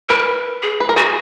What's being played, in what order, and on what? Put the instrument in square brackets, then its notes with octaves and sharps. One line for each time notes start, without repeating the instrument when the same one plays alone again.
[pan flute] A#4 [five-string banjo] B4
[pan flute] G#4
[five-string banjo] B4
A#4
[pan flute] F#4 [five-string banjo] G#4